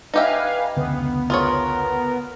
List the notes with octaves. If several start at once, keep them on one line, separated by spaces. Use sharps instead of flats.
D#4 G4 B4 E5 F5 G#5
F1 C#2 D3 B3
F4 G#4 A#4 C#5